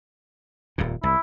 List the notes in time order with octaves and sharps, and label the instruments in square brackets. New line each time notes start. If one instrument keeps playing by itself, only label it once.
[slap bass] D#1 F2 A#2
[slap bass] C2 [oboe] E4